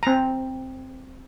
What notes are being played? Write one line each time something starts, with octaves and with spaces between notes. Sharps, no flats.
C4 A#5